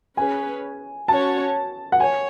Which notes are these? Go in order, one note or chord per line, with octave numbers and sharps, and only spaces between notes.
C#4 G#4 B4 G#5
C#4 F#4 C#5 A5
F#5
C#5 G#5